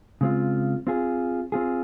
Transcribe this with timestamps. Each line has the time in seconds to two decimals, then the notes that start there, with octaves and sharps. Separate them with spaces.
0.21 C#3 G#3 C4 F4
0.87 C4 F4 G#4
1.52 C4 F4 G#4